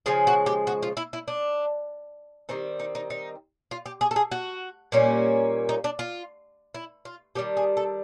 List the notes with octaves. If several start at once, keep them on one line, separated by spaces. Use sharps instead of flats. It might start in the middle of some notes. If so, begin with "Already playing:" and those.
C#3 F3 G#3 F4
F#4
G4
F#4
F4
E4
E4
D4
D#3 G3 C4 D#4
D#4
D#4
D#4
F4
G4
G#4
A4
G#4
F#4
A#2 G3 A#3 C#4
D#4
D4
F4
E4
F4
D#3 G3 B3 D4 G4
G#4
A4